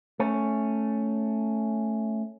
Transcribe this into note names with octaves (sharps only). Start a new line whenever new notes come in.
A3 C#4